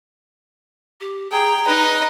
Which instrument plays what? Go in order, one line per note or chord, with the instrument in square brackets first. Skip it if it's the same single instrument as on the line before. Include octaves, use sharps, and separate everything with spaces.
[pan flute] G4
[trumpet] G#4 [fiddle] G5 [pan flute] A#5
[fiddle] D#4 D#5 [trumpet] B4